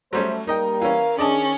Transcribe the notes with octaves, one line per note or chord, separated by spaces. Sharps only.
F#3 G3 A3 C#4 C5
G3 A#3 D#4 A#4 D#5 G5
E3 C#4 F5
D#3 C#4 D4 G#4 D5 D#5 A5